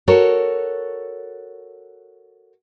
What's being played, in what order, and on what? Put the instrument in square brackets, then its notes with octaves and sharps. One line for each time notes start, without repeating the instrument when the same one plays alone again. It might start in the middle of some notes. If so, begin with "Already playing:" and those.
[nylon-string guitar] F#4 A4 A#4 C#5